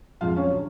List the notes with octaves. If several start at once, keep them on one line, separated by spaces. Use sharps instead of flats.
F2 F3 G#3 F4 F5
C#4 C#5
D3 F#3